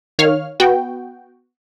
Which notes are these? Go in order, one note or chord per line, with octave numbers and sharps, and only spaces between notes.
D#3 C#5 F5 F6
B3 F#4 G5